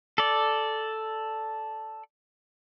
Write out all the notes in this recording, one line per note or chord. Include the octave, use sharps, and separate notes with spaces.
A4 D5